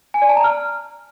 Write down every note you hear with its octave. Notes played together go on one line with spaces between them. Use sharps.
G#5
D5
A5
A#5
F6